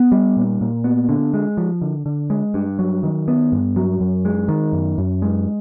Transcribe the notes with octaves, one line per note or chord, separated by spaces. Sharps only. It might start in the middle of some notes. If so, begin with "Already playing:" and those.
Already playing: B3
G3
A#2
A#2
B3
D3
G#3
F3
D3
D3
G#3
G2
F#3
D#3
B3
G2
F#3
F#2
G#3
D#3
F#2
F#2
G#3